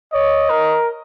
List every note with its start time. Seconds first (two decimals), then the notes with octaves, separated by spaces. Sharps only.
0.13 C#5 D#5
0.50 A#4